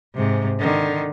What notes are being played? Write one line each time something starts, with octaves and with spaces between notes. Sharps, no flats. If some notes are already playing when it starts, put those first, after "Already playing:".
G#2 C3
D3 D#3